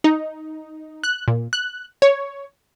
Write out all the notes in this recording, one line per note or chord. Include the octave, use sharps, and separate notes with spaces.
D#4
F#6
A#2
F#6
C#5